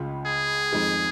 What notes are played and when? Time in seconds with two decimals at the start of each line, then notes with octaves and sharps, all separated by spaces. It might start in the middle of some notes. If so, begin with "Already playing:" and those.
Already playing: C#2 C#3 G#3 F4
0.26 G#4
0.73 F2 D#3 G#3